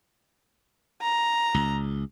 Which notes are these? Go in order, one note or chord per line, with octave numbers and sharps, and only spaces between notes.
A#5
C#2